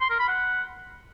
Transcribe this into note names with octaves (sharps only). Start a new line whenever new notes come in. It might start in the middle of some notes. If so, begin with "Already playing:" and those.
C6
A#4
B5
F#5